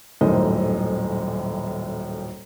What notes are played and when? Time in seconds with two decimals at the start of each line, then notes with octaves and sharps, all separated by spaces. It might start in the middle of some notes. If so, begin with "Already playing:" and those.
0.21 D#1 F#2 A2 D#3 C5 D#5